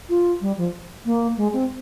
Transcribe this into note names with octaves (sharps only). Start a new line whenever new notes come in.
F4
G3
F3
A#3
G#3
C4